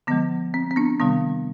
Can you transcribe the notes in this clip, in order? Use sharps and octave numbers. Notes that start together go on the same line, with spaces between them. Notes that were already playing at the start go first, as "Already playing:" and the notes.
D3 F3 G#3 B3
C4
C4
B3 D4
C3 D#3 G3 B3